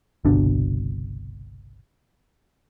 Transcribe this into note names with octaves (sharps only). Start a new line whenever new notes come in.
G1 C2 B2 D4